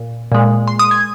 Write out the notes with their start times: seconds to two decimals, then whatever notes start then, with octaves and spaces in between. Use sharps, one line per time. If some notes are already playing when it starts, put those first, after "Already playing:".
Already playing: A#2
0.32 A#2 G#3
0.68 C6
0.79 D#6
0.91 G#6